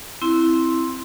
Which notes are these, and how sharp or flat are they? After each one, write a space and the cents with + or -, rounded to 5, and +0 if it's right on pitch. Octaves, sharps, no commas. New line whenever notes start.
C4 +0 E4 +0 C6 +5